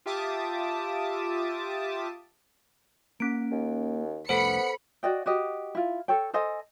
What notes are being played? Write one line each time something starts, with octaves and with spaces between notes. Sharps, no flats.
F4 G4 E5 A5 D6 D#6
A#3 C#4 D7
D#2
C2 F2 A3 B3 A4 C5 B5 C#7
F#4 D5 D#5 G5
F#4 G4 D#5
E4 F4
A4 C#5 G5
A4 C5 D#5 G#5